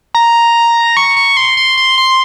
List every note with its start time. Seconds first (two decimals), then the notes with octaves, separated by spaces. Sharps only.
0.15 A#5
0.97 C#6
1.17 C#6
1.37 C6
1.57 C6
1.77 C6
1.98 C6